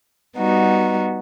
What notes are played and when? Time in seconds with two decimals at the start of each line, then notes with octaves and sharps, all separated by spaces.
0.38 G3 B3 D#4 F#4